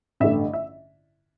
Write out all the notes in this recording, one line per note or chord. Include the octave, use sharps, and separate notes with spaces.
A1 G2 D3 A3 E5
E5